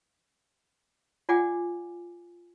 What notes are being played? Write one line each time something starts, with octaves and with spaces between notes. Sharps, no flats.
F4 D5 F#5 G#5 D6